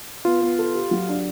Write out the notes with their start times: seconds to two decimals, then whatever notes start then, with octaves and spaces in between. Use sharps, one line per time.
0.25 B3 F4
0.41 B3
0.58 A4
0.75 G4
0.91 F#3
1.09 D4